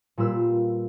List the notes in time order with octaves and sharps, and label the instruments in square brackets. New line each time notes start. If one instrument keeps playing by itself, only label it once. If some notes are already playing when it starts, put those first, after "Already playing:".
[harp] A#2 G3 F4 B4 E6